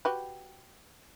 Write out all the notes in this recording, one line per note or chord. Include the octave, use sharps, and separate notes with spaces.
F#4 G4 B4